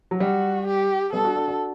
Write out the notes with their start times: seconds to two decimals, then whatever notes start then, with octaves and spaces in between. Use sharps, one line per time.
0.11 F#3
0.20 G3 F#4
0.67 G4
1.13 G3 B3 A4
1.25 D4 F#4
1.36 D4 F#4
1.48 D4 F#4